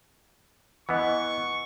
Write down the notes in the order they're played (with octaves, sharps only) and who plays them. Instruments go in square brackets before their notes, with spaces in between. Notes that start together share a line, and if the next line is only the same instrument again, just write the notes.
[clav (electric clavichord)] E3 B3 [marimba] D#5 F#5 [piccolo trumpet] C#6